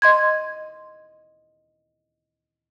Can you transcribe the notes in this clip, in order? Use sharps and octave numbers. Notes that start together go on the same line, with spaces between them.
D#5 C6 G#6